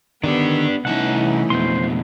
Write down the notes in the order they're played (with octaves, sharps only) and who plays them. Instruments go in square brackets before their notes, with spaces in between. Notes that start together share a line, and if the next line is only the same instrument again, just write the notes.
[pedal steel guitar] D3 D#3 [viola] B3 [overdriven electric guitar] D4 G4
[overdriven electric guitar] C2 A5 [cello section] E3 C#4 D#4 [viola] A3 E4 [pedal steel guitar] F#5
[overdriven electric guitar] F2 B2 [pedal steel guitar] C5 C6